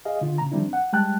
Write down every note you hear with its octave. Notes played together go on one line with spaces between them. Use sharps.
G#4 D#5 F5
D3 F4
C#3 A#5
D#3 F3 G3 C4 D4 E4
F#5
G3 G#3 G5 A5 F#6